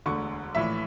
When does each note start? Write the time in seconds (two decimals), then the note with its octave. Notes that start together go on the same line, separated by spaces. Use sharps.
0.06 E1 D2 D3 C#6
0.55 A#1 A2 E3 E5